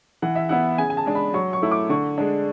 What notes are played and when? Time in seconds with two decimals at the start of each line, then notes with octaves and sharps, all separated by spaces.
0.22 E3 F#5
0.35 E5
0.49 B3 E4 F#5
0.78 C#3 G#5
0.90 G#5
0.97 A5
1.06 G#3 D4
1.15 B5
1.34 F#3 C#6
1.53 C#6
1.62 A3 E4
1.71 D6
1.90 D3 C#6
2.18 G#3 D4